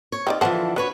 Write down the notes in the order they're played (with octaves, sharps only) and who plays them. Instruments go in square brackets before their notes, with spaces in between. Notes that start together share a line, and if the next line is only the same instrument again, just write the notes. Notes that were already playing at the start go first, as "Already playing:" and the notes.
[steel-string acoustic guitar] C#5
[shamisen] C4 D#4 D5 [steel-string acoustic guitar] F4
[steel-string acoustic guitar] D3 E3 F3 [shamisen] C5 F#5 A5
[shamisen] D4 [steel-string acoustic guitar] F#4 B4 C#5